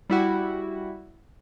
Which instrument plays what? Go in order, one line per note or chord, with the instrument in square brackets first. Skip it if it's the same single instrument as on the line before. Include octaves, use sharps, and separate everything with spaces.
[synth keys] G3 E4 F#4